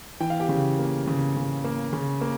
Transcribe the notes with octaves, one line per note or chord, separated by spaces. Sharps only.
E3 G5
F5
G4 G5
C#3
A#3
C#3
C#3
A#3
C#3
A#3